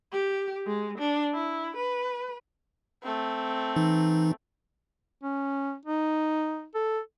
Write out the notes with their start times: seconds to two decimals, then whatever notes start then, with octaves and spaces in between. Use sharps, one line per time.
0.12 G4
0.67 G#3
0.98 D4
1.34 E4
1.76 B4
3.03 A3 C4
3.76 E3 D#4
5.23 C#4
5.85 D#4
6.75 A4